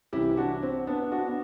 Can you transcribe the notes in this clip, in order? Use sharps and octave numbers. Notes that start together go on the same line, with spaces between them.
C2 C3 E3 E4 G4
D4 F#4
C4
B3 D4
D4 F#4
B3